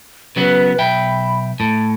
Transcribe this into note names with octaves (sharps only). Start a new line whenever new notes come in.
C#3 F#3 B3 B4
B1 E5 G5 B5
A2 A5